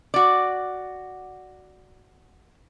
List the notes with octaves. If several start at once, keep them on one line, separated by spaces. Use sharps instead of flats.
F#4 D5